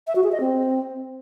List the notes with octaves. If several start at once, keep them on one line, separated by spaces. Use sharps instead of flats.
E5
F#4
G#4
D#5
C4